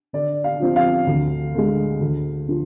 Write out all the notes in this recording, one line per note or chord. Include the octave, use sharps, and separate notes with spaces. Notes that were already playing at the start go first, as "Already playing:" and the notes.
D3 D5
F5
F3 C4 F4
F5
D2
D3 G#3
D2
D3 F3